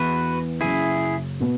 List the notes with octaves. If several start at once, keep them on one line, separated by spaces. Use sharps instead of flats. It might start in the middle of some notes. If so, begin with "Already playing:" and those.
Already playing: E2 E3 B3 F#4 B4
F#1 F#2 C#3 E4 G#4
B2 B3